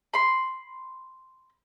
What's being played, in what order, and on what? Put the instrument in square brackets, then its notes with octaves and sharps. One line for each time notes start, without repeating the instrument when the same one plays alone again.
[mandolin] B5 C6